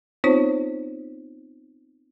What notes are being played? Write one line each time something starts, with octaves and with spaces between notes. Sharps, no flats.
B3 C4 D#4 F4 C5 C#5